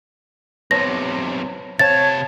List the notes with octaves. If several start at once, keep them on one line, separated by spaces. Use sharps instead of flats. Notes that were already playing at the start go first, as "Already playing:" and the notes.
B1 C3 B4 C#5 A5 A#6
C3 C4 C#5 F5 A5 A6